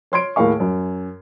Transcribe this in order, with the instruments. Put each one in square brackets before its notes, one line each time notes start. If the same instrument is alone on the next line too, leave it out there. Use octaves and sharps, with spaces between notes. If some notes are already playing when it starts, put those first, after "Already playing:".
[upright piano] C#5 C6 G#6 D7
D#2 A2 A#3 G#4 F5 C#6
F#2